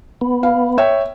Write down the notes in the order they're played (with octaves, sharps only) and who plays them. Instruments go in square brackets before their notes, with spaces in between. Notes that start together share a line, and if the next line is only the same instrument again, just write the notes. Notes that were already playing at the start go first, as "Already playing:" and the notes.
[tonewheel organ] B3
[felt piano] F5
C#5 E5 G5